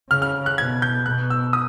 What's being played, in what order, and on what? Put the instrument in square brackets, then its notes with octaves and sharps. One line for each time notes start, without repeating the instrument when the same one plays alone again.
[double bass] C#3 [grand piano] F6
[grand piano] F6
F#6
[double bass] B2 [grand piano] G#6
[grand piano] G6
[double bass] B2 [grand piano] F#6
[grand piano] E6
D#6